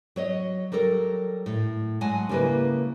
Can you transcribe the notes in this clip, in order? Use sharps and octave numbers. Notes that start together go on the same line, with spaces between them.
F#3 C#5 D#5
F#3 G3 A4 A#4
A2
F#3 G#3 F#5 G#5 A5
C#3 G3 A#3 E4 B4